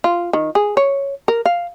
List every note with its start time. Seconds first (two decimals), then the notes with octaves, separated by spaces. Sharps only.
0.04 F4
0.33 D#3
0.55 G#4
0.77 C#5
1.28 A#4
1.46 F5